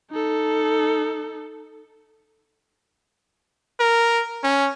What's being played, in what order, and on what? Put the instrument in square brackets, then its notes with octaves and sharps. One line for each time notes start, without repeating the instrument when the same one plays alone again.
[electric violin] D#4 A4
[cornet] A#4
C#4